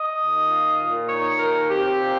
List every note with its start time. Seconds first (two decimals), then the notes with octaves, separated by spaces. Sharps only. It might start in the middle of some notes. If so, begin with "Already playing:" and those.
Already playing: D#5
0.20 D#2
0.49 F4
0.79 A#2
1.09 D#4 C#5
1.39 D#2 A#4
1.69 C4 G4
1.99 A#2